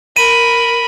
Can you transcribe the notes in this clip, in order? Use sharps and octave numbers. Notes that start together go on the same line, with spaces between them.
A#4 B5 D#7